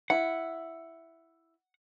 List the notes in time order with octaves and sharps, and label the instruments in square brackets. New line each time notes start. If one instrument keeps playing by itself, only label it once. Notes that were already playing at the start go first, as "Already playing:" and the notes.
[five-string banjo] E4 [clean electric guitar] F#5